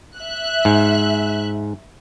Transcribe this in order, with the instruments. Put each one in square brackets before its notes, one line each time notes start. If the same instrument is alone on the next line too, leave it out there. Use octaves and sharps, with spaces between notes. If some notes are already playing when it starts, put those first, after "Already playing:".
[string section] E5 F#6
[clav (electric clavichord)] G#2